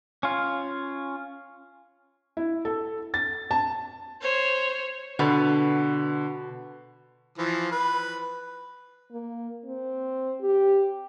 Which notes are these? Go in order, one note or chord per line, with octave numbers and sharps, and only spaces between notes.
C#4 F4
E4
A4
A6
A5
C5 C#5
B2 D3 B3
E3 F3
B4
A#3
C4
G4